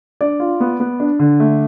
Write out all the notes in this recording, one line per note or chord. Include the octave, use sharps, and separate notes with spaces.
D4 D5
F4
B3
B3
D4
D3
A3